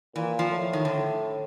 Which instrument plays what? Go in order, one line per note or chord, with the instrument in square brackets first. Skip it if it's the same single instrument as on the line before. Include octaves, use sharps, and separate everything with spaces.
[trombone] A#2 [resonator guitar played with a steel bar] E3
[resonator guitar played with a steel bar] F3
[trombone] A2
[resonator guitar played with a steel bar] D#3
D3